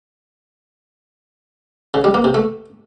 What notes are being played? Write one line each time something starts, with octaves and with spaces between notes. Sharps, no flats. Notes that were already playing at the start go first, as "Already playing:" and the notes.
C#3
G3
A#3
C3
A3